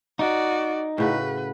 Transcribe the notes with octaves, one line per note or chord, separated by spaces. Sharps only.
D#4 F#4 D5
A2 C#3 F#4 B4